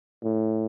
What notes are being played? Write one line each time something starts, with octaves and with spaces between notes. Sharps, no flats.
A2